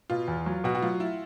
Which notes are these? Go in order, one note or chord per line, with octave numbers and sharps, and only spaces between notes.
B2 F4
E2
F#3
B2 F#4
F#4
F#3 F4
E4